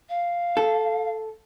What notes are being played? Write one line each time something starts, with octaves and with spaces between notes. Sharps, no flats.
F5
A4